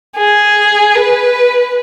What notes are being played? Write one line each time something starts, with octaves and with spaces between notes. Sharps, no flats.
G#4
B4